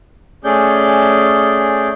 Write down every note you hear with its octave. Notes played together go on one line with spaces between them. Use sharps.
A3 C#4 G#4 D5 G6